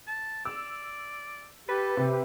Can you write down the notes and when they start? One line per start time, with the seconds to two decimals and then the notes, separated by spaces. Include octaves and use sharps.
0.07 A5
0.45 D5 E6
1.69 G4 A4 B4
1.97 C3 G4